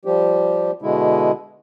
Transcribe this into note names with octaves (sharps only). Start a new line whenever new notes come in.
F3 G3 G4
B2 D3 G#3 E4